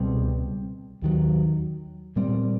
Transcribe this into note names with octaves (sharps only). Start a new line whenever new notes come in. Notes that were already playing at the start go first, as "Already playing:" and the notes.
Already playing: C#2 B2 G3 C4
D#2 D#3 F#3
A#2 G3 C4